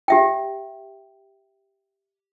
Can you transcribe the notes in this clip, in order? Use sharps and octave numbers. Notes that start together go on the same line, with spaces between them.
G4 E5 G5